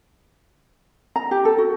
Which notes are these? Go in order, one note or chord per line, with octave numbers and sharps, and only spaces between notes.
A#5
G4
A4
F#4